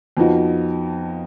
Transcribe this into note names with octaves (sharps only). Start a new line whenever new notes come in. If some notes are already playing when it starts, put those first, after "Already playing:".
F2 F3 B3 D#4 F#4